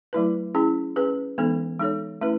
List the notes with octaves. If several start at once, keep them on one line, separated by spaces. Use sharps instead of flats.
F#3 A3 E4 B4
C#4 E4 G#4
C#4 G#4 B4
E3 G#3 B3 D#4 A4
G#3 D#4 A4 C#5
A3 C#4 E4 B4